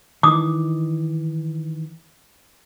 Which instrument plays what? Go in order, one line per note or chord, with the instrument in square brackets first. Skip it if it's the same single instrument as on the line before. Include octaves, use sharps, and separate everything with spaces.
[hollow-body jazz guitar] D#3 E3 [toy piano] D6 D#6